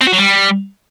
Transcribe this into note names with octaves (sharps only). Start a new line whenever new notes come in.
C4
F#4
F#3
G3